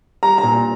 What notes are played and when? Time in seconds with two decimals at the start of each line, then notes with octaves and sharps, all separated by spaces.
0.23 G3 A#5
0.38 A#5
0.43 A#2